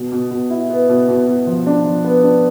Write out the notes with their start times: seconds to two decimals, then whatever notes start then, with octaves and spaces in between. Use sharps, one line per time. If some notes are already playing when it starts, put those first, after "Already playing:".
Already playing: B2
0.12 B2
0.31 B2
0.50 E4
0.70 B3
0.89 B2
1.08 B2
1.28 B2
1.47 F3
1.66 D4
1.85 F3
2.04 B3
2.24 D4